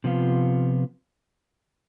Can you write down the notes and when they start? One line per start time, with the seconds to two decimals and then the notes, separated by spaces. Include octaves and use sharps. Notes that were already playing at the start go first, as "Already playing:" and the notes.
0.04 C3 F3 B3 F4